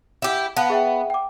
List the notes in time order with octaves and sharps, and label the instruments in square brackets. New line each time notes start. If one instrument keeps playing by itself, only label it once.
[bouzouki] E4 G4
[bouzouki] B3 [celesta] F5 A5 F#6
[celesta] G#4 E5 G5
G5 D6